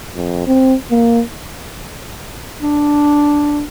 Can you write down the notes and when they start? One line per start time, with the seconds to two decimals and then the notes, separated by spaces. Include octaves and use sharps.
0.14 F2
0.47 C4
0.91 A#3
2.61 D4